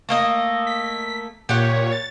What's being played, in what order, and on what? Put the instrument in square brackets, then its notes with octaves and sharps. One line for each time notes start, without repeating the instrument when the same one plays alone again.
[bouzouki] A3 A#3 D#5
[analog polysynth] B6
[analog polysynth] A#2 C#5 [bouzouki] G4 F#5
[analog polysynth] A6